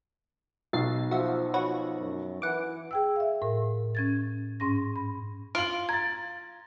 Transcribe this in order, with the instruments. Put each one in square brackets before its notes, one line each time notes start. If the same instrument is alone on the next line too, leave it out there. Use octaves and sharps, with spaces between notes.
[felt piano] B1 [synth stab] A6 C7
[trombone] F3 [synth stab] F#4 E5
[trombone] F3 [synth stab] F#4 B4 C#5
[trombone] F#2
[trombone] E3 [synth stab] F#5 D6
[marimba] G#4 G5 E6
E5 F5
A2 A#4
C#4 G#6 A6
G#2 C#4 C6 A#6
B5
[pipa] F4 [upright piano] F5 F#7 [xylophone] D7
[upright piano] A#5 A6 [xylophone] G#6